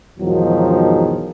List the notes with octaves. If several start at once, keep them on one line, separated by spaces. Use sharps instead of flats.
E2 G#2 B2 D#3 F3 F#3